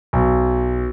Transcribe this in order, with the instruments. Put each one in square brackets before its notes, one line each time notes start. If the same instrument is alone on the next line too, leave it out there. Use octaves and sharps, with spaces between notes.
[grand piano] B1